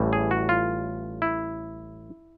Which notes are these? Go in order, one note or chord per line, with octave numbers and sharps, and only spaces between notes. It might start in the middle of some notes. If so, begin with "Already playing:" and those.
Already playing: A1 A2 E3 G3
G#4
F#4
F4
E4